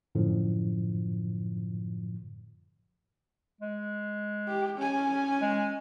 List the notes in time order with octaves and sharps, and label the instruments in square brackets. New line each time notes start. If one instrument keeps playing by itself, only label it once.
[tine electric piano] F#2 A2 D3 F3
[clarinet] G#3
[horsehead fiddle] G4
C#4 G#5
[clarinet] G#3